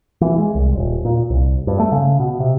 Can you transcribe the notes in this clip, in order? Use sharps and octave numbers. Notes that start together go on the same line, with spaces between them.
E3
G#3
C2
D#1
A#2
C2
G2
A3
C#3
B2
C3